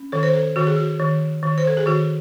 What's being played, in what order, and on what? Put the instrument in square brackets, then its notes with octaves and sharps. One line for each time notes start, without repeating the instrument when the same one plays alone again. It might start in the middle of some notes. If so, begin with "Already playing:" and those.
Already playing: [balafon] C#4
D#3 A4
C5
A4
D#3 F#4
G#4
F#4
D#3
D#3
C5
A4
G#4
D#3 F#4